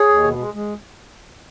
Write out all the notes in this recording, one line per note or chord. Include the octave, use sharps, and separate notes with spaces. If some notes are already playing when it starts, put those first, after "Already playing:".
Already playing: G#4 C#5
D#2
B2
G#3
G#3